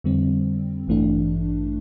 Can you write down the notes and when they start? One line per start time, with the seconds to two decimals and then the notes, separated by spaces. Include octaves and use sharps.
0.04 F2 D3 G3 C4
0.87 A1 G2 E3 A3 D4